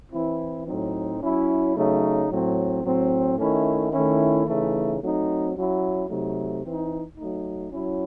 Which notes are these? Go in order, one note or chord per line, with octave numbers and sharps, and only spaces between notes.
E3 C4 E4
A2 F#3 C4 D#4
F#3 C#4 E4
C#3 F#3 A3 D#4
A2 F#3 C4
A2 F#3 C4
D#3 A3 C#4 E4
D#3 A3 C#4 E4
C#3 E3 A3 D#4
F#3 A3 C4 D#4
F#3 C#4 E4
C3 F#3 A3 D#4
E3 C4 D#4
F#3 A3 D#4
F#3 C#4 E4